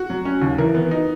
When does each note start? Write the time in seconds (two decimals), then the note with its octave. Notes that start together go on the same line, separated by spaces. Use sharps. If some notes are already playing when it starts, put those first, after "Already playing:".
Already playing: F#4
0.10 F#3
0.25 C#4
0.41 D#2
0.58 E3 A#4
0.75 B3
0.91 D#4